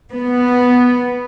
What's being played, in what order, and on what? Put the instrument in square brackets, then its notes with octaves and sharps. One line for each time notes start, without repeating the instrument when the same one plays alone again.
[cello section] B3